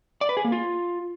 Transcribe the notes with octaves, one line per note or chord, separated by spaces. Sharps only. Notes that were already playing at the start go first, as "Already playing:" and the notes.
D5
B4
G#4
A#3
F4